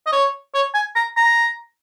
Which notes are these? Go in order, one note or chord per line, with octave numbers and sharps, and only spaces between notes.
D#5
C#5
C#5
G#5
A#5
A#5